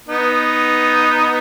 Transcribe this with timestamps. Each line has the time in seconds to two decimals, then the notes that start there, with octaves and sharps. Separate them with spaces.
0.09 B3 D#4